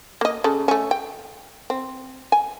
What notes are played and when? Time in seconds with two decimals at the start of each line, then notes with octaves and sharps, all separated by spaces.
0.21 A#3 D#5
0.44 C#3 A4
0.68 A3 C#4
0.91 G5
1.70 C4
2.32 G#5